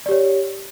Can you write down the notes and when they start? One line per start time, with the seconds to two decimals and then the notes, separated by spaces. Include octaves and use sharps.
0.06 D5
0.09 G4
0.11 C#5